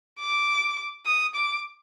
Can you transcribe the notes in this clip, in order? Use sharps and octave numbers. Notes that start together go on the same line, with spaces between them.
D6
D#6
D6